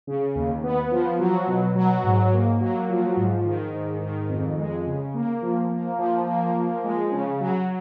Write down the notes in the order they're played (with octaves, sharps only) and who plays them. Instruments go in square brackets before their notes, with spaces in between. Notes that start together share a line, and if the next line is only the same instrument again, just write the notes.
[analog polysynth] C#3
D#2
B3
F3
F#3
B2
F#3
G#2
A#3
F#3
F3
G#2
D#3
G#2
D#3
F2
G#3
C#3
A#3
F3
A#3
F3
A#3
F3
G#3
C#3
F#3